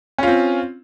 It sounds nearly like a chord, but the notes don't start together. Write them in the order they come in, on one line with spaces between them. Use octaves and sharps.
C#4 F4 C4